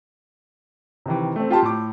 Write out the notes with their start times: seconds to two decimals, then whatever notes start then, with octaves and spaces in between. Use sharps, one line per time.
1.06 C3 D#3 E3
1.36 A3 C4
1.50 F4 G4 A5 C6
1.62 A2 D6